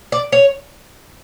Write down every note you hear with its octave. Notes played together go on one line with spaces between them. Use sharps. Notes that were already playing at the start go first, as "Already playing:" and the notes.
D5
C#5